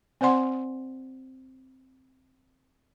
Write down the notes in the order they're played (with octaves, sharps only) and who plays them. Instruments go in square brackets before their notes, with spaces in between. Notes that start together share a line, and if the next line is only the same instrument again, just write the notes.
[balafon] C4 C5 D5 F#5 C6